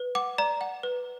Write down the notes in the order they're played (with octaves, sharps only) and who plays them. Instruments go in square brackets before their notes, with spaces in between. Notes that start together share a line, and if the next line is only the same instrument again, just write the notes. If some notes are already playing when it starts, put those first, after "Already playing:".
Already playing: [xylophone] B4
F#5 D6
D5 A#5
F#5
B4